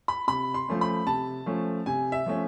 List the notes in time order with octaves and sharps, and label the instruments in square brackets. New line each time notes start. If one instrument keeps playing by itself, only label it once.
[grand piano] B5
C3 B5
C6
F3 A3 C#4
B5
C3 A5
F3 A3 C#4
C3 G#5
E5
F3 A3 C#4